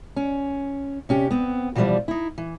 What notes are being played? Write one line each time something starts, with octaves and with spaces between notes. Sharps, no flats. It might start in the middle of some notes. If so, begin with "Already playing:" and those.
C#4
C3 C#4 G4
B3 C4
B2 E3 F3 G3 C5 D5
D#4 E4
E3